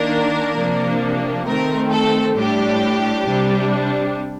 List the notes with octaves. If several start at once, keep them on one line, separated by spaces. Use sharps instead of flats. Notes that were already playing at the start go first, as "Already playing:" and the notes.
Already playing: D#3 A#3 D4 A#4
C3 F3 A#3 D4
D#3 A3 C4 A#4
A4
A2 G3 D4 G4
C3 G3 D4